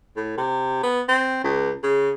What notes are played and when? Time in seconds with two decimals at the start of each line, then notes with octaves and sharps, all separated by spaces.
0.16 A2
0.38 C3
0.83 B3
1.09 C4
1.44 C#2
1.83 C#3